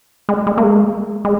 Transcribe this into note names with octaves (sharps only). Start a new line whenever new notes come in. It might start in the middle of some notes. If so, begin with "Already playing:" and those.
G#3
G#3
A#3
G#3
G#3